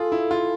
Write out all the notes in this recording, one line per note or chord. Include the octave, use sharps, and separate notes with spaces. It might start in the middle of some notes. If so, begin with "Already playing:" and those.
Already playing: F4 G#4 A4
E4
F4